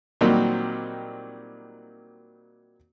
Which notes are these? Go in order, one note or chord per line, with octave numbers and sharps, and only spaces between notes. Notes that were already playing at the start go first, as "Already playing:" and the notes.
A#2 D#3 F#3 G3 A#3 C4